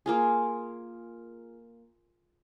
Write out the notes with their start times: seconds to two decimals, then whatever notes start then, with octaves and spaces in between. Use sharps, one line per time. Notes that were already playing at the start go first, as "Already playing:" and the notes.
0.06 A#3 F4 G#4